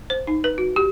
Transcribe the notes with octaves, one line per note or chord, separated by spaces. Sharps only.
C5
D#4
B4
F#4
G4